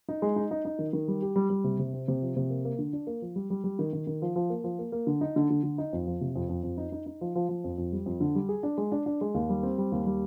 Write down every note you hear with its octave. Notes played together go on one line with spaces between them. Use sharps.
D#4
G#3
D#4
D#4
D#4
D#3
D#3
G3
G4
G3
G3
C3
C3
C4
C3
F3
C3
A#3
A#3
D3
D4
A#3
F3
G3
G3
G3
D#3
D#3
D#3
F3
F3
A#3
F3
A#3
A#3
D3
D#4
D3
D3
D3
D#4
F2
F3
C3
F2
F2
F2
D#4
D#4
D#4
F3
F3
F3
F2
F2
G3
F2
D3
G3
G#4
D4
G#3
D4
D4
G#3
D#2
G3
C4
G3
D#2
G3